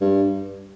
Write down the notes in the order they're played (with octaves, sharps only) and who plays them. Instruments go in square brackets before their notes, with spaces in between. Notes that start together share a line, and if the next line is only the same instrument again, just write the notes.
[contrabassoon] G2